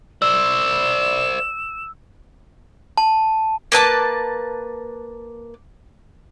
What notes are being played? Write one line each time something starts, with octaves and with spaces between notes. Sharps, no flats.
C5 D5 E6 E7
A5
A#3 B4 A5 D6